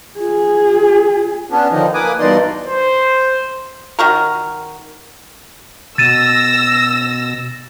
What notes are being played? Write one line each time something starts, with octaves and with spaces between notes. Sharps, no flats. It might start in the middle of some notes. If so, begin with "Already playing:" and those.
F4 G#4
B3 C#4 D4
D3 D#3 F3 D#4
A#3 B4 G#5 D6 D#6
G2 B2 E3 D#4 D5 C6
C5
D#3 F#4 A#4
B2 E6 A6 A#6 D#7 E7